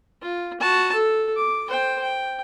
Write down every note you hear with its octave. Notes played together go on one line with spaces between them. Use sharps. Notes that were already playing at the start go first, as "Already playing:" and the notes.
F4
F#4 A5
A4
D6
C5 G5
G5